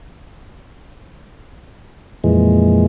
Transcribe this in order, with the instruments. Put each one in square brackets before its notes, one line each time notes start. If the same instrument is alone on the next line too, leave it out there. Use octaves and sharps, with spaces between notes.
[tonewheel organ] F2 A#2 E3 G#3